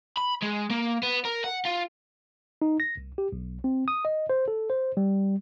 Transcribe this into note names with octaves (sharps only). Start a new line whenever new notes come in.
B5
G#3
A#3
B3
A#4
F#5
F4
D#4
A#6
C2
G4
B1
C4
D#6
D#5
C5
A4
C5
G3